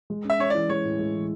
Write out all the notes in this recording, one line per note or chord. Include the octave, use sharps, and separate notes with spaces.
G#3
C#4
E5
C#4 C#5
E3 D5
G#3 C#5
A2
G#3
E3